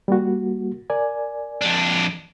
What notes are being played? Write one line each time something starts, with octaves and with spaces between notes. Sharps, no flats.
G3 A#3 F#4
A#4 D5 G#5
F2 D4